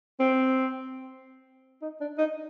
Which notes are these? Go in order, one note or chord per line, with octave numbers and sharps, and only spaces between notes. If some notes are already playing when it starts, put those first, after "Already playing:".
C4
D#4
D4
D#4